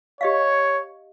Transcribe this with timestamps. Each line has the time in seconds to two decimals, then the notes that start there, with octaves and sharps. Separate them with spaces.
0.21 G4 C#5 D#5 F5